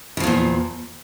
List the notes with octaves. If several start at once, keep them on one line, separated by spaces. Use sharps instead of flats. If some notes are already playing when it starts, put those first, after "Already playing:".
E2 A#2 C#3 F3